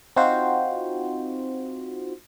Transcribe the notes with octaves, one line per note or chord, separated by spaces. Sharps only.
C4 D#4 F4 F#4 C5